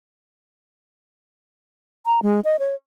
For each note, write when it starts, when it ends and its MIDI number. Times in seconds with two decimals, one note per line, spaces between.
2.06 2.20 82
2.22 2.40 56
2.45 2.57 75
2.59 2.75 73